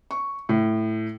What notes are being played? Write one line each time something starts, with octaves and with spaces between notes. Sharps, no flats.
C#6
A2